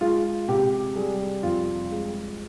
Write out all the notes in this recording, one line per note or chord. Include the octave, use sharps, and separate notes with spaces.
G#3 F4
C3 G4
G3 G#4
F2 F4
G#3